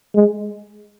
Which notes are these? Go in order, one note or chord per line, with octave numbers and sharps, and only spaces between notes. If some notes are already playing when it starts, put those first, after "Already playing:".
G#3